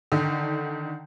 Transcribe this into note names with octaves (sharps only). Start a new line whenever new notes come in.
D3 D#3